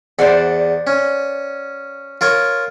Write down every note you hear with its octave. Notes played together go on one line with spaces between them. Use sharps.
E2 C5 D5 F#5
C#4
F4 A#4 C#5